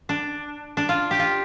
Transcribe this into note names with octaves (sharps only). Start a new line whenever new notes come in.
D4
D4
F4
G4
F4